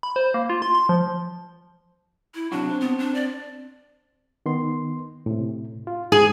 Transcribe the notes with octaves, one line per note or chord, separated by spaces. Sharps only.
B5
C5
A#3
F4
C6
C6
F3
E4
C3 F#3 D4 F#4
C4
B3
D4
D5
D#3 B3 C6
A2 C3
F4
G#2 G#4